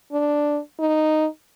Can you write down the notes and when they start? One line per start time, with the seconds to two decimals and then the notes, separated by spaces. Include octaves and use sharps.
0.12 D4
0.79 D#4